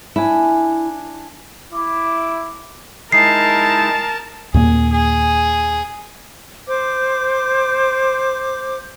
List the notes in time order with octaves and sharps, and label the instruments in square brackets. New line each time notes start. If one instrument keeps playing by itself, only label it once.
[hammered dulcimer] D4 G#5 [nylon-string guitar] E4
[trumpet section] E4 D6
[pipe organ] G#3 D#4 E4 [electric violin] A#4 A5 [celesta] C7
[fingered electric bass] D#2 A#2 A#3 [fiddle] G#4
[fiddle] G#4
[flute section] C5 D6